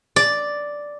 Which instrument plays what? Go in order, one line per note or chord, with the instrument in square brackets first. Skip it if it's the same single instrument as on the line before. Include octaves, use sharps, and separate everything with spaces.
[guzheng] D5